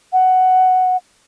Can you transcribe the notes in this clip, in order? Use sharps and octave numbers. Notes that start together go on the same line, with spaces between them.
F#5